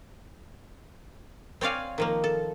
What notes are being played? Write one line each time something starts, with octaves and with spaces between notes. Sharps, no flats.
C4 C#5 D5 F5 G#5
D#3 F3 A#3
A4